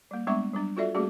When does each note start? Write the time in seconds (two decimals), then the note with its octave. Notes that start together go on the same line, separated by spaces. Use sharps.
0.11 G3 A#3
0.27 G3 G#3 B3 D4 E5 C#6
0.53 F#3 G3 D4
0.77 F4 F#4 A4 D5 E5
0.95 G3 A3 A#3 C#4 F#4 G#4